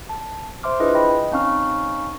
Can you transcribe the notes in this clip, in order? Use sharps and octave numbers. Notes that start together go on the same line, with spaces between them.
A5
C5 E5 C6 D6 F6
D4 E4 F4 G#4 B4 D#5
D#5 G5 B5
C4 C#4 D#4 F5 C#6 F6